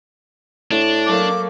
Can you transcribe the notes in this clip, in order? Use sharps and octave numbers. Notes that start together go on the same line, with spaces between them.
A2 D4
F#3 A3 A#3 D6